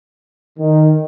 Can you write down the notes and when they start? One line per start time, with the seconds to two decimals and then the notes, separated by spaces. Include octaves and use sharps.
0.59 D#3